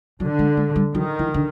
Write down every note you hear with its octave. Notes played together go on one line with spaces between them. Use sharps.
D3 F#3
G#3
G#3
G3
D#3 F#3
E3
D3